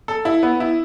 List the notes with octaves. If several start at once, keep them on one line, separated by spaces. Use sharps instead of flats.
A4
E4
B3
E4